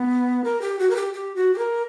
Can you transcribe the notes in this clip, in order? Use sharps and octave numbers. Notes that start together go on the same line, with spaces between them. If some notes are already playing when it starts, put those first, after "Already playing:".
Already playing: B3
A#4
G4
F#4
A#4
G4
G4
F#4
G4
A#4